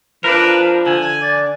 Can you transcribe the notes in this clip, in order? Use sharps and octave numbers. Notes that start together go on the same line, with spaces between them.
F3 D4 A#4 B4
D3 G#5
D5